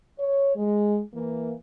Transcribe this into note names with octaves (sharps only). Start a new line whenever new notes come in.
C#5
G#3
E3 A#3